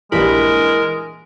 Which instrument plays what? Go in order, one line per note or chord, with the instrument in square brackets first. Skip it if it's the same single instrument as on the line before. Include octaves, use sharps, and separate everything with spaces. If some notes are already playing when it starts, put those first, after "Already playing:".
[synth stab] A#1 G2 B5 [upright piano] E3 [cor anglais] G#3 [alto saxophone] A#4